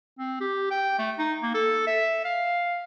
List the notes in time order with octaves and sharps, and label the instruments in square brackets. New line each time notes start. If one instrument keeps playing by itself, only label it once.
[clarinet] C4
G4
G5
A3
D#4
A#3
A4
E5
F5